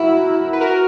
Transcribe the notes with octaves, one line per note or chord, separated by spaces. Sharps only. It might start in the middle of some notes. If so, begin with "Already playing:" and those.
Already playing: E4 F#4 A#4
B4
F#4 A#4